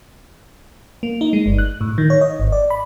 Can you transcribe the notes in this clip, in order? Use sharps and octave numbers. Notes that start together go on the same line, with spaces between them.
A#3
D#4
G#3
G1
F#6
A2
D#3
C#5
D#5
G#1
D5
B5